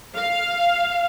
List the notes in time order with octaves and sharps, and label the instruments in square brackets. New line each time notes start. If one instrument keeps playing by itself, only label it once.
[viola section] F5